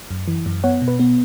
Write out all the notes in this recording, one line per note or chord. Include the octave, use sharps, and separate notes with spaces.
F#2
E3
F#2
B3 C#5 F#5
B2
B4
B3